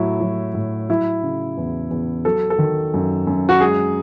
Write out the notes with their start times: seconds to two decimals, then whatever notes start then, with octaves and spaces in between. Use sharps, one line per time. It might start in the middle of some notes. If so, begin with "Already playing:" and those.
Already playing: A2 F#3 E4
0.21 F#3
0.54 A2
0.89 F#3 E4
1.23 C#3
1.57 E2
1.91 E2
2.25 F#3 A4
2.50 A4
2.59 D#3
2.94 F#2
3.27 F#2
3.49 F#4
3.61 G#3 G#4